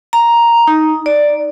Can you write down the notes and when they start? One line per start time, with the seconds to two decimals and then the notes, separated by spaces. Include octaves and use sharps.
0.13 A#5
0.67 D#4
1.06 D5